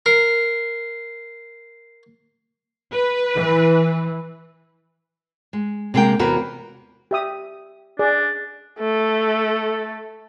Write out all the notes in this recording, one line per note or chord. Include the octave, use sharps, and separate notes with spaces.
A#4 C7
B4
E3
G#3
C3 G#3 A#3 A#4 G5
E2 C3 F#4 A#4 B4
G4 E5 D#6
D4 G#4 D5
A3 A4